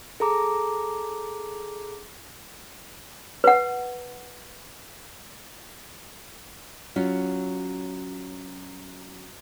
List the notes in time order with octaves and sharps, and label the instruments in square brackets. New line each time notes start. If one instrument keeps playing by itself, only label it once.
[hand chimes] G#4 A4 A#5 D6
[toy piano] B4 F#5
[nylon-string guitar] F#3 C#4 F4